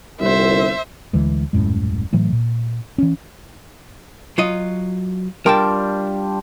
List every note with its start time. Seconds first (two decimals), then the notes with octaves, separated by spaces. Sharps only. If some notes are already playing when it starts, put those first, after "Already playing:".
0.20 G1 C2 C5 E5
1.13 D2 D3 E3 G#3
1.53 D#1 F#2 A2 G#3
2.13 A2 E3 F#3 A3
2.32 A#2
2.98 E3 C#4
4.38 F#3 F4 D#5
5.46 G3 D4 F4 A#4 G5 A5